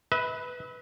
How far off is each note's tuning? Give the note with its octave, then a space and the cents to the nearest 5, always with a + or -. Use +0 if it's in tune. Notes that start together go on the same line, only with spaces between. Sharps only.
B4 +0 E5 -40